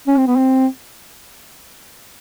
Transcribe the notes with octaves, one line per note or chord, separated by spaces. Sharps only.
C#4
C4
B3
C4